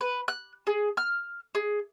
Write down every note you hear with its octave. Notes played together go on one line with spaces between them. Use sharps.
B4
F#6
G#4
F6
G#4